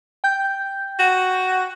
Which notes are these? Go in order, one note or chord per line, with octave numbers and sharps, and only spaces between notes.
G5 G6
F#4